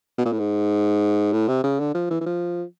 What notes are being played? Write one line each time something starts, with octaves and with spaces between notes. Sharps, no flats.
B2
A#2
A2
G#2
A2
C3
C#3
D3
F3
E3
E3
F3